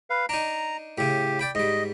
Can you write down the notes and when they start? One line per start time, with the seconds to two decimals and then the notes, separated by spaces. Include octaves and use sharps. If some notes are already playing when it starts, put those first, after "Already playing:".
0.10 B4 F5
0.29 D4 D#4 A#5
0.98 A2 C#3 G4
1.39 D5 G5 B5
1.55 G#2 G3 D#5